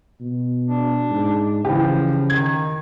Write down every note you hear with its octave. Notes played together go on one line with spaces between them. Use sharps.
B2
D4
G#2
C#3 E3 F3 G4
D#3 G#6